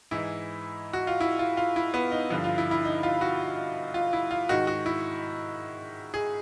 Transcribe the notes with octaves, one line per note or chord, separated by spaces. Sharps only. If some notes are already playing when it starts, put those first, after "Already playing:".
G#2 E3 E4
F#4
F4
E4
F4
F4
E4
B3
D#4
G2 D3 F3 E4
F4
E4
E4
D#4
F4
F#4
F4
E4
F4
G#2 D#3 F#4
F#4
E4
G#4